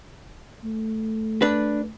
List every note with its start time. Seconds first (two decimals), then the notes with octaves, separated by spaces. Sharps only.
0.64 A3
1.42 D4 B4